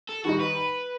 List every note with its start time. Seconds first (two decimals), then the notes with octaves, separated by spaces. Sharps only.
0.09 A4
0.24 D#3 G3 D#4 F#4
0.40 B4